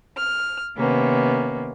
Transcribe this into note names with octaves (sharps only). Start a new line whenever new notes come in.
F6
C3 D#3 A#3 B3 C#4